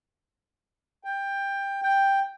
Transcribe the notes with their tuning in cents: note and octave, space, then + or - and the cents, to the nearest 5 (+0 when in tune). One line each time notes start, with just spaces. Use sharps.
G5 +15
G5 +5